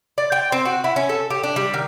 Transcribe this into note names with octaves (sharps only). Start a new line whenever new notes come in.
D5
G5
C4
F#4
E4
C#4
A4
G4
D4
G3
D#3